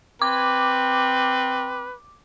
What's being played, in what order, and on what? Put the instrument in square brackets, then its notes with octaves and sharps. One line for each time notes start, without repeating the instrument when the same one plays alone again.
[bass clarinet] C4 [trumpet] B4 [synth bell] D6